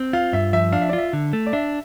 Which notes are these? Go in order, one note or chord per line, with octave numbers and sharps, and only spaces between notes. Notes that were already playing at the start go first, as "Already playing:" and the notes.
Already playing: C4
F4 F5
G2 E5
F3 E5
D4 F5
E5
D5
F4 E5
D3
A3
D5
D4 E5